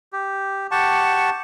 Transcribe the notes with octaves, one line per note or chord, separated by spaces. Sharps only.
G4
G4 F#5 A5 C#6